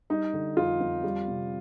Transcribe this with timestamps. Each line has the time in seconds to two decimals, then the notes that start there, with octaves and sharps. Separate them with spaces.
0.10 G3 D#4
0.33 D3
0.57 F2 F4
0.80 F2
1.04 G3
1.27 C3